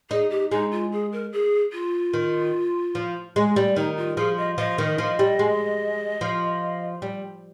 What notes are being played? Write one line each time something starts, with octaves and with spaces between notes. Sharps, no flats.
D#4 G#4
G4
G#3 D#4
F4
G#4
A#4
G#4
F4
D#3
F3
G#3
G3
D#3 D#4
F4
F3 G#4
D#5
F3 D#5
D#3
F3
G3
G#3
F3
G3